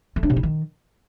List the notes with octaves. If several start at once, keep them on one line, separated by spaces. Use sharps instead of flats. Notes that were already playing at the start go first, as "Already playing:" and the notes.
A3
D4
C3
E4
D#3